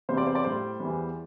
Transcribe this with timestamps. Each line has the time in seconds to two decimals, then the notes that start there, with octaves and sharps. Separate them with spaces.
0.09 E2 C3 G3 C5
0.17 D5
0.27 C5
0.35 D5
0.44 A2 G3 C5
0.80 E2 E3 G3